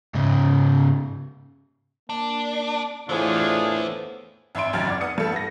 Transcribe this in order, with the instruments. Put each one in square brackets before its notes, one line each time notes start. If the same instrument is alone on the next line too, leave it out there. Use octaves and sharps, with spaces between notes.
[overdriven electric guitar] G#2 C#3
[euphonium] A#3 [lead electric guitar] D4
[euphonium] A2 [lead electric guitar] E3 B3 [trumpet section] D4 F4 G#4 [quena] C5
[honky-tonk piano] G#1 E5 B5 C6 D7
G#1 C#2 F#2 F6 G#6 A6
D5 F#5
B3 D#6 C#7
G2 A4 C#7
B3 A#6